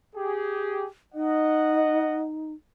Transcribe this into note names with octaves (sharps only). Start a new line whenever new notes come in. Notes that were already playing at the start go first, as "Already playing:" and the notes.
G4 G#4
D#4 D#5 F#5